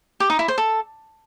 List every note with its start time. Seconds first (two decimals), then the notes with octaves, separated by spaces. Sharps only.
0.20 G4
0.30 D#4
0.39 E4
0.48 C5
0.58 A4